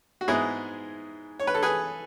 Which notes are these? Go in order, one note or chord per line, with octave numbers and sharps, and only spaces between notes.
F#4
G#2 G#3 B3 E4 G#4
C#5
B4
A4
G#4 B4